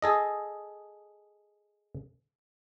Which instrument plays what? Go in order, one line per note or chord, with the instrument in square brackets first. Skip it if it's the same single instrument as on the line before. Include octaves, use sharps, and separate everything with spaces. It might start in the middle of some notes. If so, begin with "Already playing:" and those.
[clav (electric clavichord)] G#4 A4 D#5